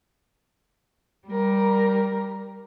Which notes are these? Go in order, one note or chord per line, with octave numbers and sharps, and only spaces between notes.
G3 A#4